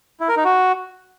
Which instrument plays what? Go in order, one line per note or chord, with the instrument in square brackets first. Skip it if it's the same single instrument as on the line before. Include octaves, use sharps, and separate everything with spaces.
[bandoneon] E4
A#4
D#4
F#4